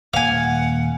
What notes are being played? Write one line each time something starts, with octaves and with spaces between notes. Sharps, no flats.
D#1 A#3 F5 F#5 G#5